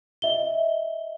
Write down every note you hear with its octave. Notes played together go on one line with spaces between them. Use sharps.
D#5 E5 G7